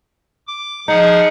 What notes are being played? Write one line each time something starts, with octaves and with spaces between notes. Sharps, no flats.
D6
F3 D#4 G#4 F#5